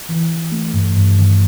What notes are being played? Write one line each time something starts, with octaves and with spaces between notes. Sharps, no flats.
E3
E3
A3
G2
G2
D#3